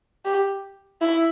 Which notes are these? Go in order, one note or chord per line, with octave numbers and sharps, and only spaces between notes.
G4
E4